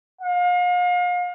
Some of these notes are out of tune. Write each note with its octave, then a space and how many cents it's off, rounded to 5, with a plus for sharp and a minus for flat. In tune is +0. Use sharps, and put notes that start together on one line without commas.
F5 +40